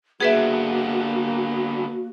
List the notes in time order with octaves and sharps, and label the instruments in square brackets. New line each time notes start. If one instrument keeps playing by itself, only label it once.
[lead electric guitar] D3 B3 [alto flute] A#3 [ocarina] F#4 [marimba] G#4 B4 E5